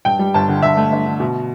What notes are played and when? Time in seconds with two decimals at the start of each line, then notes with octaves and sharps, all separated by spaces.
0.05 G2 G5
0.19 G3
0.34 G1 A5
0.49 D3
0.62 G2 E5
0.77 A3
0.92 G1
1.06 D3
1.20 B2